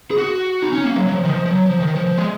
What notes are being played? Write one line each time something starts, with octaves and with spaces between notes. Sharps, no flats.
G#4
F#4
D#4
C#4
A#3
F#3
F#3
F3
D#3
F3
F3
F#3
F3
D#3
F3
F3
G#3